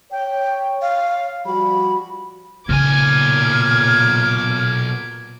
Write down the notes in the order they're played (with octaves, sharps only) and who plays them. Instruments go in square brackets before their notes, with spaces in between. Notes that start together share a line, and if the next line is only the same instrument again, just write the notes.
[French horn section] C#5 [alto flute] G5
[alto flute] F5
[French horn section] F3 G3 F#4 [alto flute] B5
[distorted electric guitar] B1 G#5 [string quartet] A#2 D6 G#6 [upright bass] C#3 D#4 [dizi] F6